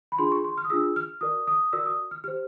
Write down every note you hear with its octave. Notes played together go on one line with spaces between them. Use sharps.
B5
D4 F4 G#4 C6
C#6
C6
F6
D#6
D4 F4 G#4 E6
F6
F#4 A#4 D5 D#6
D#6
F#4 A#4 D5 E6
D#6
F6
G4 C5 F6